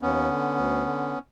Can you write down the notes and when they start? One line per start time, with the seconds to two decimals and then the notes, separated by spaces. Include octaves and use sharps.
0.02 D#2 B3 C#4
0.30 D3
0.57 D2
0.86 D3